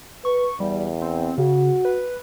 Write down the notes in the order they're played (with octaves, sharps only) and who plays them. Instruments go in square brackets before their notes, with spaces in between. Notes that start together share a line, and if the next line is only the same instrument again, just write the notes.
[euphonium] B4 [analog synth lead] C#6
[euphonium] E2 [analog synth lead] G3
[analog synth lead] C4
[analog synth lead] C#3 [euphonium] F#4
[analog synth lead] B4